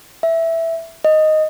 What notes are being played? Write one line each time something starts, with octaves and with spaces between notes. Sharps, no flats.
E5
D#5